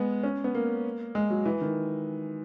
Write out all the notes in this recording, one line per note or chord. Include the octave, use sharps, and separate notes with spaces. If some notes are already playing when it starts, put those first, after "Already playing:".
Already playing: G#3 B3
C#4
B3
A#3
G#3
F#3
E3
D#3